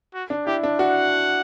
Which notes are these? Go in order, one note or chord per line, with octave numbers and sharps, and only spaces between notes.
F#4
D4
E4 G4
D4
F#4 F#5